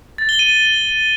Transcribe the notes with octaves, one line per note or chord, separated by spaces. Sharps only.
A6
G7
D#7